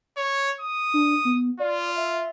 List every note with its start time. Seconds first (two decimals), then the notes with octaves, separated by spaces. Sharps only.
0.17 C#5
0.61 D#6
0.94 D4
1.25 B3
1.60 F4 D5
1.97 E5